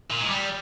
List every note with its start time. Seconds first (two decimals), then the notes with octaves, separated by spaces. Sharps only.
0.10 A#2
0.21 G#3
0.29 G3